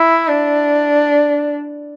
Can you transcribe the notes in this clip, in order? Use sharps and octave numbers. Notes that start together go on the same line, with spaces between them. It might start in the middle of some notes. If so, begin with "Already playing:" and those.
Already playing: E4
D4